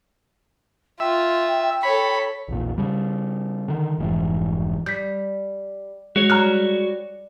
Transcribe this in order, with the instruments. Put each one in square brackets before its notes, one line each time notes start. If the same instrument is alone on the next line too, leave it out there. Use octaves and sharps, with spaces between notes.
[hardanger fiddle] F4 [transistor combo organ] E5 [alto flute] G5
[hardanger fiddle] A4 C#5 [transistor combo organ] B5
[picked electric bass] A#1 E2 A#2
C#3 G3
D3 D#3
F1 G#2 E3
[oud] G3 [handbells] G6 B6
[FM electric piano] G#3 [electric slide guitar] F#4 C#5
[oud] G3 [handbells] A#5 F6 F#6